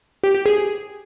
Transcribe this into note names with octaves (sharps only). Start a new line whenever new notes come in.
G4
G4
G#4